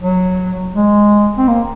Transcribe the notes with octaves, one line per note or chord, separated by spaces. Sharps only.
F#3
G#3
C4
A#3